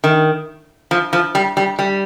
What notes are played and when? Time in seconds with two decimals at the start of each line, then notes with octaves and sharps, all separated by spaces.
0.04 D#3
0.91 F3
1.13 F3
1.35 G3
1.57 G3
1.79 G3